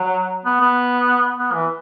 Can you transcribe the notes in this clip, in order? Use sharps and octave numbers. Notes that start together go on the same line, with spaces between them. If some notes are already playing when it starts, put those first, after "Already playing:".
Already playing: F#3
B3
B3
B3
E3